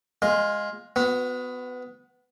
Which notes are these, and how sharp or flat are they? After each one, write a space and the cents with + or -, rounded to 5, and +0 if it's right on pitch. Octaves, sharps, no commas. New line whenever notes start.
G#3 +0 F4 +15
B3 +20 F#4 -30